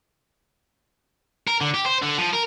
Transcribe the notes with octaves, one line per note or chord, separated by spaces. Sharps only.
A#4
D3
G4
C5
D3
F3
A#4